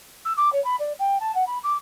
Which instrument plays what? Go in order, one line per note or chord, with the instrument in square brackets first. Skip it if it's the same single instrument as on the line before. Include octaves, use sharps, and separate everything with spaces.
[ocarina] E6
D6
C#5
B5
D5
G5
A5
F#5
B5
D6